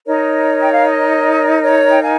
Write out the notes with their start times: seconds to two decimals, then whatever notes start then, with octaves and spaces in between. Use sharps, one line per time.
0.06 D#4 A#4 C#5 D#5
0.62 G5
0.73 F5
0.84 D#5
1.63 C#5
1.91 G5
2.03 F5 G#5